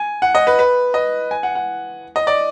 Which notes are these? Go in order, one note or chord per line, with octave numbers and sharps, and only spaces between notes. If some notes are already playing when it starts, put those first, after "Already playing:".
Already playing: G#5
F#5
D#5
B4
B4
D#5
G#5
F#5
F#5
D#5
D5